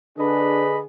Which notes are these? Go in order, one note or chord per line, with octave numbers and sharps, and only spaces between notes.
D3 D4 G#4 B4 D#5 B5